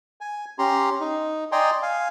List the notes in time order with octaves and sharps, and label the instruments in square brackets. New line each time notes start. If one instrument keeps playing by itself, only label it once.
[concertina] G#5
C#4 G4 A#5 C6
D#4
D5 D#5 G5 G#5 A#5 C6
F5 G#5